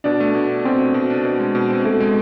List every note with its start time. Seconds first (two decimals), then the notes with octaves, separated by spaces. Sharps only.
0.04 B2 D4
0.20 A3
0.35 B2
0.49 D4
0.65 B2 C4
0.80 A3
0.94 B2
1.10 D4
1.25 B2
1.40 G#3
1.55 B2
1.70 C4
1.84 B2 A3
2.00 G#3